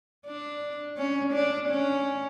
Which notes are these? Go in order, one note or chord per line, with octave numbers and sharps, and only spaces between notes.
D4
C#4
D4
C#4